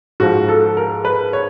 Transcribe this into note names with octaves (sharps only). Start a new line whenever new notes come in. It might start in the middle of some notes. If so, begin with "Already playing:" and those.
G#2 F3 F#4
A4
A#4
B4
C#5